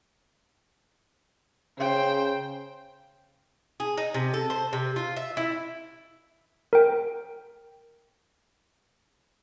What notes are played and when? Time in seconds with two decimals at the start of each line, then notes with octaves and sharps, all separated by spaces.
1.79 C#3 C5 G5
3.80 G#4
3.97 D#4
4.14 C3
4.34 A4
4.50 C5
4.73 C3
4.96 F4
5.16 E5
5.37 E4
6.73 A#4 G5